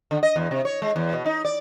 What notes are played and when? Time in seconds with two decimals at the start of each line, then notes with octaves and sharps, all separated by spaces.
0.11 D3
0.23 D#5
0.36 E2
0.51 C3
0.65 C#5
0.82 G#3
0.96 E2
1.13 B2
1.26 D#4
1.45 D5